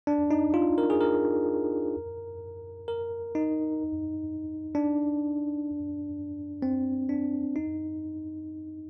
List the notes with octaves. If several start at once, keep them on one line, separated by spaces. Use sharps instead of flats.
D4
D#4
F4
A#4
G#4
A#4
A#4
D#4
D4
C4
D4
D#4